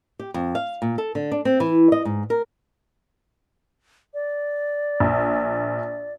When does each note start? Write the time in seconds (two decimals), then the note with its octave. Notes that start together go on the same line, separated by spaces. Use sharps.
0.19 G4
0.34 F2
0.55 F5
0.82 A#2
0.98 A4
1.15 D3
1.32 D4
1.45 C4
1.60 E3
1.92 D#5
2.05 G#2
2.30 A#4
4.14 D5
5.00 A#1